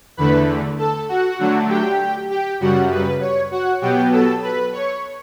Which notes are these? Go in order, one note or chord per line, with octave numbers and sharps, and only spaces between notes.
E2 D3 A3 B4 B5
A4 A5
F#4 F#5
D3 F#3 A3 D4
G4 G5
G4 G5
F#2 C#3 G3 F#4 F#5
B4
C#5
F#4 F#5
B2 F#3 B3 G4 G5
A4 A5
B4 B5
C#5 C#6